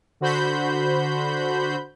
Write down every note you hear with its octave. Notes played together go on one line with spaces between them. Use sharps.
D3 F#4 C5 B5 G6